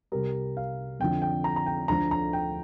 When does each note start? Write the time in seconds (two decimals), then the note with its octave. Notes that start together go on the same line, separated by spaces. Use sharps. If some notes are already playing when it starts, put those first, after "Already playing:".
0.12 C2 C3 G3 A#4
0.57 F5
1.00 F2 D3 F3 G5
1.22 G5
1.44 A#5
1.56 A#5
1.66 G5
1.88 D2 D3 F3 A#5
2.11 A#5
2.33 G5